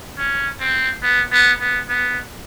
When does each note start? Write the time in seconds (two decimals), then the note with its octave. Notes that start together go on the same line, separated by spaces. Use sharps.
0.18 C#4
0.60 C4
1.03 B3
1.32 B3
1.60 B3
1.89 B3